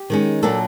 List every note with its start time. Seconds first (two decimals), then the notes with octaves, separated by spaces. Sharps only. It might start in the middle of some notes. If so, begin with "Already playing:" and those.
Already playing: G4
0.10 D#3 G#3 C#4
0.43 A#2 F#3 A#3 D4 A4